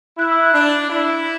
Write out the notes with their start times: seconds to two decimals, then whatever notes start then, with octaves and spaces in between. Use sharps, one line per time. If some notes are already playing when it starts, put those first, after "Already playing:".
0.18 E4 F#6
0.29 E6
0.41 F#6
0.53 D4
0.89 E4